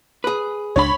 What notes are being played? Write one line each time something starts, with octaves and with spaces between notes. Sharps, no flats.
G#4 B4
C#2 D4 C#5 B5